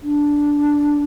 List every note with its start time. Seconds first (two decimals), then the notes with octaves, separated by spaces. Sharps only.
0.03 D4